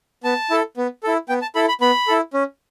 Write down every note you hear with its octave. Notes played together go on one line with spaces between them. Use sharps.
B3 A5
E4 A4
B3
E4 A4
B3 G5
A5
E4 A4 B5
B5
B3 B5
E4 A4
C#4